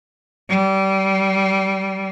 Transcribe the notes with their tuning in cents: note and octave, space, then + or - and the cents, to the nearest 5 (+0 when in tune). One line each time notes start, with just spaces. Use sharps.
G3 -25